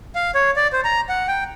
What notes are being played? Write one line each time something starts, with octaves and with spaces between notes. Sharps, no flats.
F5
C#5
D5
C5
A#5
F#5
G5